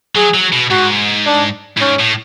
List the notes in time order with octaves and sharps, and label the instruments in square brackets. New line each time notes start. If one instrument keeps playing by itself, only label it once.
[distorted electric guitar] F#3 [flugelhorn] G#4
[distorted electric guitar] F#3
B2
[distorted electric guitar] G#2 [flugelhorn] F#4
[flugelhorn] D4
[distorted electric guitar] A2
[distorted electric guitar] G#2 [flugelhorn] C#4
[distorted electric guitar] A2